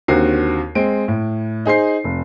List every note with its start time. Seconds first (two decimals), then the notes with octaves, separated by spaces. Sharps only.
0.08 D#2 D3 C4 F#4 A#4 C7
0.75 G#3 C4 D7
1.08 A2
1.65 D#4 G#4 C5 C7
2.04 F1